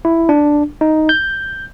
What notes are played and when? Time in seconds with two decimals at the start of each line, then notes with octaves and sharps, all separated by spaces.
0.05 E4
0.29 D4
0.81 D#4
1.09 G6